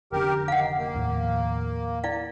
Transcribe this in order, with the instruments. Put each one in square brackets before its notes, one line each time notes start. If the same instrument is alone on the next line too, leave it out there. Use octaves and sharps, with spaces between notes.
[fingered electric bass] F1 D3 C#4 [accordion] G4 A#4
[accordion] D#3 [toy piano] F5 F#5
[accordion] A#3
[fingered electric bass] D#2 A2 F3
[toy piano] E4 D5 F5